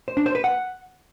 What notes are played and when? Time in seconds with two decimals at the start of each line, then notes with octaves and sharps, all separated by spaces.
0.08 C5
0.17 D4
0.26 C5
0.35 B4
0.44 F#5